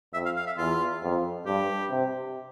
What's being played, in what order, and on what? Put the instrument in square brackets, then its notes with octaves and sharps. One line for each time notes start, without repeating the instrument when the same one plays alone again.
[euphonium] F2 [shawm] E5
[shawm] F5
F5
E5
[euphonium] E2 [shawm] F4
[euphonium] F2
[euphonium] G2 [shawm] G4
[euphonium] C3